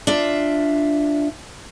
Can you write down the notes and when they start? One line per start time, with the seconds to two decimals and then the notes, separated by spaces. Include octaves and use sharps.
0.07 D4 F4 E5